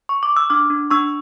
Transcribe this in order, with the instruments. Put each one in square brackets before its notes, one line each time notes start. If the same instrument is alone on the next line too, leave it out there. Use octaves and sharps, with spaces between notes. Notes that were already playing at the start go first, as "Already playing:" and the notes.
[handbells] C#6
D6
E6
D4 D6 F6
D4
D4 C#6 E6